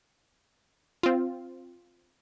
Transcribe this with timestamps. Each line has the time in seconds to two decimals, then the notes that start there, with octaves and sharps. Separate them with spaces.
1.03 C4 F4